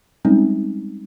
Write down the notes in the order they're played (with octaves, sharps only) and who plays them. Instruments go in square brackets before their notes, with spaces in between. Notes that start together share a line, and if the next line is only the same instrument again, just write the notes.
[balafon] G3 G#3 C4 C#4 D#4